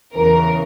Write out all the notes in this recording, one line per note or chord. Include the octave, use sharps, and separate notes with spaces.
E2 C#3 E3 A#4